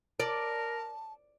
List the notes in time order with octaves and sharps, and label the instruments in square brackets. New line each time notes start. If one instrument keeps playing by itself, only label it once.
[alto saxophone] A#4 [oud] D5 [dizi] A5